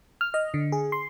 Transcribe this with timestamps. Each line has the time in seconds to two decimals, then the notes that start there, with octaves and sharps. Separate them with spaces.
0.21 F6
0.34 D#5
0.54 D3
0.72 G#4
0.92 C6